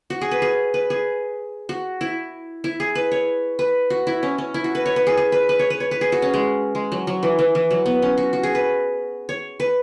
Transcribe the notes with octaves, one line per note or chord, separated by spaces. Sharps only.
F#4
G#4
B4
G#4
B4
G#4
F#4
E4
E4
G#4
B4
C#5
B4
F#4
E4
C#4
C#4
E4
F#4
B4
C#5
B4
G#4
G#4
B4
B4
C#5
B4
C#5
B4
G#4
F#4
C#4
G#3
G#3
F#3
F#3
E3
E3
E3
F#3
B3
C#4
F#4
F#4
G#4
B4
C#5
B4